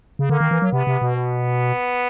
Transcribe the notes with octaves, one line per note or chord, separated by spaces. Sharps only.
C#3
D3 A#3
D#3
E3
F#3
C3 B3
C3
B2
B3